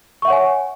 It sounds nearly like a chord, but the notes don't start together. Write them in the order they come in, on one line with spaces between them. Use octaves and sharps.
C#6 E5 F#5 C#5 G#5